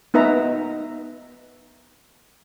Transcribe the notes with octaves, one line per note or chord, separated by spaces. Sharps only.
B3 D#4 B4 E5 A#5